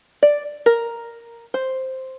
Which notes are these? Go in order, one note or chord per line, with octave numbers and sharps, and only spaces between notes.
D5
A#4
C5